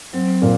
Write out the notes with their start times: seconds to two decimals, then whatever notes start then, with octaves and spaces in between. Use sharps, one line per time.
0.13 F#3 C4
0.42 A#2